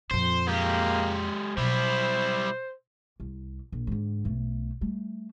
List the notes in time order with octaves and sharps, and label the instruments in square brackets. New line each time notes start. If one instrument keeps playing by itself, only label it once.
[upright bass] F2 A#2 [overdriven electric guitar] C5
[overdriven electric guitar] G#3 G4 [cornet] A#3
[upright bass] B2 F#3 [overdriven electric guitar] G3 E4 [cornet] C5
[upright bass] C2
A#1
G#2 D3
B1 A3
G3 A3